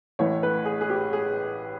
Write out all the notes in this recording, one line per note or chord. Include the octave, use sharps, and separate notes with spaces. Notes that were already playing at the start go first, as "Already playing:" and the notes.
A1 A2 E3 C#5
B4
G#4
G#4
G4
G#4